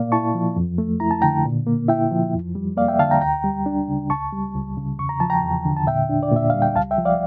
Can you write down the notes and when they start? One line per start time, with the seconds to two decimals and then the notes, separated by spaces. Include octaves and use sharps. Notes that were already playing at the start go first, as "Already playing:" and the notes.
Already playing: A#2 A#3 D5 F5
0.12 E4 A5 C#6
0.35 F3
0.56 F2
0.78 A3
1.00 E4 A#5
1.11 A5
1.22 D3 G5 A#5
1.45 A#2
1.66 A#3
1.88 E4 E5 G5
2.11 F3
2.34 F2
2.55 G3
2.77 A#3 D5 F5
2.88 E5 G5
2.99 D3 F5 A5
3.11 G5 A#5
3.21 D2 G5 A#5
3.44 G3
3.66 D4
3.88 C#3
4.10 C#2 A5 C#6
4.33 G3
4.55 C#2
4.77 C#3
4.98 E2 C#6
5.09 A#5
5.20 F3 A5
5.30 G5 A#5
5.43 E2
5.65 D3
5.77 A5
5.87 A#2 E5 G5
6.09 D4
6.23 D5
6.31 A#2 E5
6.50 G3 F5
6.62 G5
6.76 C#2 F5 A5
6.91 E5 G5
6.98 F3
7.05 D5 F5